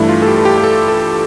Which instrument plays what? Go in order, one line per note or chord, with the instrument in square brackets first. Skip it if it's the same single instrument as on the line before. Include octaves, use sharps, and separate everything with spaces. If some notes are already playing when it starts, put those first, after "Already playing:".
Already playing: [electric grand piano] G2 E3 A3 E4
F4
A4
G4
A4
G4
G4
A4
A4